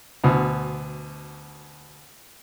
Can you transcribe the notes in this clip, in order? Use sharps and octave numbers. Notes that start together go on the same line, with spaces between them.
D2 B2